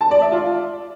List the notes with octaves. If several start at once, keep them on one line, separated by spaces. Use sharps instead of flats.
A5
D5
E5
F4